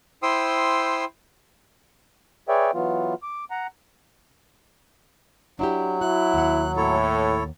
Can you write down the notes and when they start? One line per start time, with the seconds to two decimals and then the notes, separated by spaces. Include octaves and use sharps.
0.23 E4 C5 G5 C6 D#6 E6
2.49 G#4 B4 C#5 D5 E5 G5
2.74 E3 F#3 B3 F4
3.23 D6
3.51 F#5 A#5
5.59 F#3 D4 E4 G4
6.01 E4 F#4 F#6
6.34 D#2 F#5
6.76 A2 E4 A4 C#5